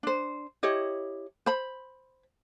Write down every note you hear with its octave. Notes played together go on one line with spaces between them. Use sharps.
D4 C5
E4 G4 C#5 D#5
C5 B5